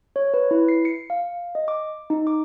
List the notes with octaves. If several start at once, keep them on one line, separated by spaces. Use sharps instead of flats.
C#5
B4
E4
C7
C#7
F5
D#5
D6
D#4
D6